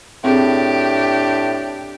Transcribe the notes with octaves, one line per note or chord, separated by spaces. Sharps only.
A2 C4 D4 G4 G#4